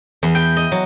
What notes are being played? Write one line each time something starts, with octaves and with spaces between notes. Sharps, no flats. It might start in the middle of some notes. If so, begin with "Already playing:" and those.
E2
G5
D#5
F#3